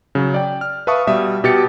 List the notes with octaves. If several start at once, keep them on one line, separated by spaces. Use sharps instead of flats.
C#3 F#3
D5 G5
F6
B4 E5 F5 A5 C#6 D#6
B2 G3 E5 D#6
B2 G4 A6 C#7